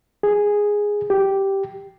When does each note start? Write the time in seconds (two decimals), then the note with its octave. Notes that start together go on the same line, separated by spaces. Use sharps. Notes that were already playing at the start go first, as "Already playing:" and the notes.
0.23 G#4
1.10 G4